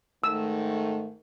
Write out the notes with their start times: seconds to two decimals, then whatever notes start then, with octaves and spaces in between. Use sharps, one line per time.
0.24 G#2 D#3 A3 E6